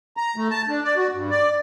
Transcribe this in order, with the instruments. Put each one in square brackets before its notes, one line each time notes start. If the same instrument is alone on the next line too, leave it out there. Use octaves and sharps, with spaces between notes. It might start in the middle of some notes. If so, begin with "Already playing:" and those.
[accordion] A#5
A3
A5
D4
D5
F#4
G2
D5